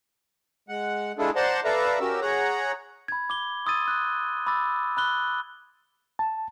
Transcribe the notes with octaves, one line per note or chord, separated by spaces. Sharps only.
G#3 F#5
G#3 D4 E4 F4 G#4 A4
C5 D5 F#5 A5 A#5 C6
A4 B4 D5 E5 F5 A#5
C#4 F#4 G4 A#4 E6
G#4 C#5 F#5 A#5
B5 G#6
D6 G7
C6 D#6 E6 G#6 A6 D#7
F#6
B5 D6 E6 A6
B5 F#6 G7
A5